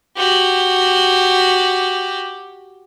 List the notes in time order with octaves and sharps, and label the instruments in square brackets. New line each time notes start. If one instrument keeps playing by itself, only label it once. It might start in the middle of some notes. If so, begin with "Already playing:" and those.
[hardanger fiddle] F#4 G4